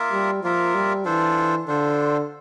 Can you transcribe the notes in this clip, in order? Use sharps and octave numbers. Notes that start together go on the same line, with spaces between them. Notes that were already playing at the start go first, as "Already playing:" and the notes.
Already playing: A#3 F4 A#4 E5
G3
F3 A#3 F4 A#4 E5
G3
E3 D4 F4 A4 C5
D3 D4 F4 A4 C5